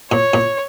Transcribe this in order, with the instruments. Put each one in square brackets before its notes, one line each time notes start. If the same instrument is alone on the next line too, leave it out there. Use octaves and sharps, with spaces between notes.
[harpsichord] A#2 [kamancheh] C#5
[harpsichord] A#2